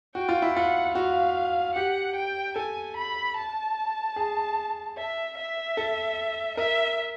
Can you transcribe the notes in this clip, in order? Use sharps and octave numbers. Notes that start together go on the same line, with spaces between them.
F#4 G5
F4
E4
F4 F#5
F#4 F5
G4 F#5
G5
A4 G#5
B5
A5
G#4
E5
E5
A4
A#4 E5